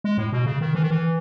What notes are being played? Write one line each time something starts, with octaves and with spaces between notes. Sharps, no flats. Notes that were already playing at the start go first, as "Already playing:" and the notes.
G#3
A2
B2
C#3
D#3
E3
D#3
E3